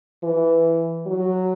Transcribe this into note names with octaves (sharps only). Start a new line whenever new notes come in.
E3
F#3